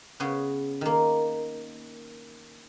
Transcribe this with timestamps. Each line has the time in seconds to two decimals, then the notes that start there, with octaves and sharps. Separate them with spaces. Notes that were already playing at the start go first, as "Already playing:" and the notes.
0.20 C#3 B3 C#4 G#4
0.81 D#3 A#3